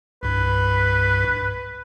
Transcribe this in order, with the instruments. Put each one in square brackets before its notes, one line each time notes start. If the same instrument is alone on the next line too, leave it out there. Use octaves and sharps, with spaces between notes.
[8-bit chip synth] C2 G2 [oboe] B4